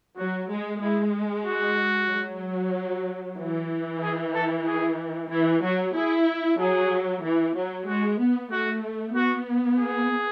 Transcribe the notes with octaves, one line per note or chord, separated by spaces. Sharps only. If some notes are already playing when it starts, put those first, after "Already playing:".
F#3 F#4
G#3
G#3 E4
F#4
F#3
E3
G#4
A4
G#4
E3 E4
F#3 F#4
E4 G#4
F#3 G#4
E3
F#3
G#3 F#4
B3
A3 F#4
B3 F#4
G#4